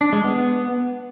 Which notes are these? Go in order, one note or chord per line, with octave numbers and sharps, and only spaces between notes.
D4
G#3
B3